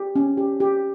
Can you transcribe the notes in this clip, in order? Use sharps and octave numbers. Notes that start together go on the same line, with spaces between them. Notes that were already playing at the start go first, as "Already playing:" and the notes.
Already playing: G4
C#4
G4
G4